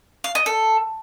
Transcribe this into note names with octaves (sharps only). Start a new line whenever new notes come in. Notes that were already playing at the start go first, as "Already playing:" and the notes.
F5
D#5
A4